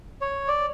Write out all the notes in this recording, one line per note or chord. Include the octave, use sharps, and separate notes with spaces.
C#5
D5